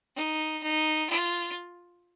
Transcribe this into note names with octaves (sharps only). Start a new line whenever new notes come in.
D#4
D#4
F4